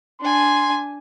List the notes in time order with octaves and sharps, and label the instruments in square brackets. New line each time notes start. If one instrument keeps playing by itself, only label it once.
[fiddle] D4 G#5 [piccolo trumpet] C6